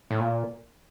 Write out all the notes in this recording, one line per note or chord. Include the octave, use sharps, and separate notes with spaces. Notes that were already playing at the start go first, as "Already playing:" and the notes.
A2
A#2